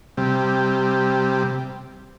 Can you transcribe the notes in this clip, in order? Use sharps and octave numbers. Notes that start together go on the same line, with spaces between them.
C3 G3